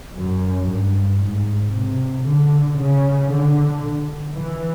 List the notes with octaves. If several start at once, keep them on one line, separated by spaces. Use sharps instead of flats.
F#2
G2
G#2
C3
D3
C#3
D3
E3